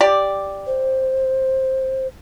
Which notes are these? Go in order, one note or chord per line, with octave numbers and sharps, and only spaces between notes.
G4 D5
C5